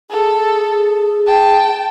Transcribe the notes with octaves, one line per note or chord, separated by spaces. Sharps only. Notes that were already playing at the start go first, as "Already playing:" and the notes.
G#4 A4
G5 A5